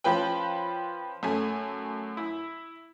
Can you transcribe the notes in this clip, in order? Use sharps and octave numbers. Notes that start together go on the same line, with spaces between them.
F3 C#4 B4 G5
F#2 A3 G#5
E4